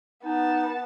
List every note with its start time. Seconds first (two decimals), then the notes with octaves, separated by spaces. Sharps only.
0.25 B3 D#4 A5